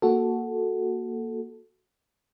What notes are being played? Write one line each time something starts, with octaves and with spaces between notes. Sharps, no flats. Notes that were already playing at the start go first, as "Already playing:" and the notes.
A#3 F#4 A4